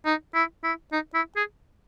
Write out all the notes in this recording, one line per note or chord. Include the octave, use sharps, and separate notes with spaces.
D#4
E4
E4
D#4
E4
G#4